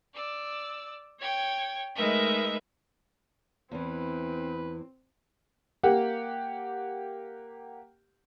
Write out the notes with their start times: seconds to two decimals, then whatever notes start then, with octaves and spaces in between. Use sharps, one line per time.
0.14 D5 E6
1.19 C#5 G5 G#6
1.95 G#3 A3 D#4 A#4 B4 E5
3.71 E2 E3 C4 B4
5.83 A#3 G4 F#5